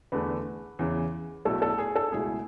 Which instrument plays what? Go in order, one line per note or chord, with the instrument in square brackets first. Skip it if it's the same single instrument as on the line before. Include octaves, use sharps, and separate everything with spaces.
[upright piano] E2 D3 A3 [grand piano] B4
[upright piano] E2 C#3 E3
[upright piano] B1 B2 A3 E4 [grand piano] A4
[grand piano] A4
G#4
A4
[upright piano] C#2 B2 A3 E4 [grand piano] G#4